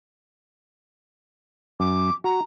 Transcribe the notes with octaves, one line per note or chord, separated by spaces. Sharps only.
F#2 D6
F#4 A#5